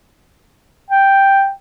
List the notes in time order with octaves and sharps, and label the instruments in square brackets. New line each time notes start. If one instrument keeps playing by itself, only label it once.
[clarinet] G5